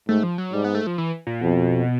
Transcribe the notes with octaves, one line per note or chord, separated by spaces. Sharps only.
G#2 A3
F3
F#3
G#2 G3
B3
A3
F3
E3
A#2
F2 B2